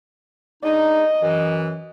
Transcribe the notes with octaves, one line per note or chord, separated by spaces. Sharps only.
G#3 D4 D#4 D#5
F#2 E3